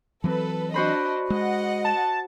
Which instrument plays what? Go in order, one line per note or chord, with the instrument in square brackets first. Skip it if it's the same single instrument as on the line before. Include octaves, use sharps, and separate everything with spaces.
[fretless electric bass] E3 F#3 C4 [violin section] A4 B4
[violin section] D4 D#5 [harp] F#4 C5 B5
[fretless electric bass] G#3 [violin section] D#5 F#5
[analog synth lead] A5